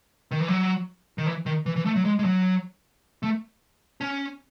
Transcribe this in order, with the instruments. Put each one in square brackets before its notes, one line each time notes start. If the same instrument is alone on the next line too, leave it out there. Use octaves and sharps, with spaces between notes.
[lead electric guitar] D#3
E3
F#3
D#3
E3
D#3
E3
E3
A3
F#3
G#3
G#3
F#3
A3
C#4